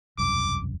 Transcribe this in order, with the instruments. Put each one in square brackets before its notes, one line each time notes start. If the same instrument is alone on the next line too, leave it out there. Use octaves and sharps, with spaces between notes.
[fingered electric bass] E1 C2 F#2 [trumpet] D6